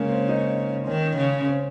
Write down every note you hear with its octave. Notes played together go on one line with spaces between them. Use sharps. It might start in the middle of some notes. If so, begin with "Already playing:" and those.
Already playing: C#3 G#3 A#3
C4
D#4
D#3 C#4
C#3
C4